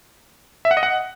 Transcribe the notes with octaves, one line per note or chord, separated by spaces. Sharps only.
E5
F#5
D#5
F#5